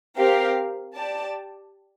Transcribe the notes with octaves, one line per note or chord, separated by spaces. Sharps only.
C4 G4 A#4 F5
G4 D5 A5